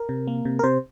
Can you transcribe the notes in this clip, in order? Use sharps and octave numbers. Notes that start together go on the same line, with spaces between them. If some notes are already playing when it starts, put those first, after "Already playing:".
Already playing: A#4
C3
A#3
C3
A#4
C3 C5